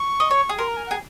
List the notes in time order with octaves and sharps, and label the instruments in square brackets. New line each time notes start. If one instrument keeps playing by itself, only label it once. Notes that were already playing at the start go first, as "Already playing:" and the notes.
Already playing: [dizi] C#6
[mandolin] D#5
C#5
G#4
[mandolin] A#4 [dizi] C6
[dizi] A#5
G#5
F#5
[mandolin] G#4